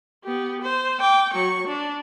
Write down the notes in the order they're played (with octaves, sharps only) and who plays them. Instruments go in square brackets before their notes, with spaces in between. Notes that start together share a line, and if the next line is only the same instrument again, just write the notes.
[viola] B3 G4
C5
G5 D6
F#3 C#6
D4